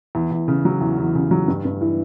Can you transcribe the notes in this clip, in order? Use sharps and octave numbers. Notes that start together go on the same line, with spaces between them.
E2
E2
C#3
F#3
E2
E2
C#3
F#3
G2
G2
E3